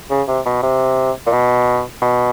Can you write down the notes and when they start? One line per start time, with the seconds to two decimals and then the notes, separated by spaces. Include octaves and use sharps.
0.10 C#3
0.28 C3
0.46 B2
0.63 C3
1.26 A#2
1.33 B2
2.02 B2